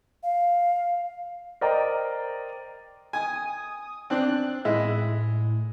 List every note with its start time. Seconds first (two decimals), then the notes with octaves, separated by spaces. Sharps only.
0.23 F5
1.61 A#4 C5 D5 D#5 G5 A#5
3.13 G#5 D#6
4.10 C4 D4 F#6
4.65 A2 G#3 E4